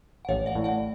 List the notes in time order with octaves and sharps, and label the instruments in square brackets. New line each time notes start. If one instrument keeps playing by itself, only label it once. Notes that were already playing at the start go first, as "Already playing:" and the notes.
[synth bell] F#5
[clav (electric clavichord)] A1 [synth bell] C#5 F5
[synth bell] D5 F#5
[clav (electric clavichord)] A2
[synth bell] D5 F#5